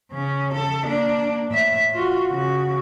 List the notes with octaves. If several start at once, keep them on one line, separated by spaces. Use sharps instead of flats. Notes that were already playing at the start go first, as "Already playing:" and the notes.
C#3 C#4
A4
A#3 D4
A2 E5
F4 F#4
C#3 F#4